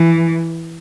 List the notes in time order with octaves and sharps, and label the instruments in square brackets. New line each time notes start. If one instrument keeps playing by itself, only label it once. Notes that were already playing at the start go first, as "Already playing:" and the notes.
Already playing: [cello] E3